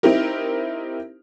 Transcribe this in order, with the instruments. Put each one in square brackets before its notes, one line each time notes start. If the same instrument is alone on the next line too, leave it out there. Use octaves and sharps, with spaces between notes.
[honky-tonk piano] C4 D#4 E4 G4 A#4